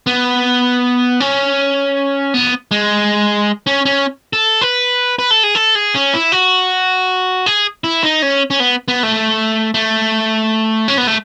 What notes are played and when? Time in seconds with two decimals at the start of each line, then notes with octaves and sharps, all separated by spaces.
0.07 B3
1.20 C#4
2.34 B3
2.71 G#3
3.67 C#4
3.86 C#4
4.33 A4
4.61 B4
5.19 B4
5.31 A4
5.44 G#4
5.55 A4
5.75 G#4
5.95 C#4
6.14 E4
6.32 F#4
7.46 G#4
7.84 E4
8.03 D#4
8.22 C#4
8.50 C#4
8.60 B3
8.88 B3
9.03 A3
9.74 A3
10.88 C#4
10.98 B3
11.07 A3